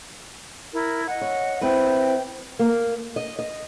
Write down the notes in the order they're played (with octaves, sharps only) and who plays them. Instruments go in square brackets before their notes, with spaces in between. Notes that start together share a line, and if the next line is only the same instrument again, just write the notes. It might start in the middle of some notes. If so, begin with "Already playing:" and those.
[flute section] E4 A#4
D#5 F#5
[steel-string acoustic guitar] C#5
[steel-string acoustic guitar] C4 E4 B4 [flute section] G5
[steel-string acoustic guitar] A#3
D#5
D#5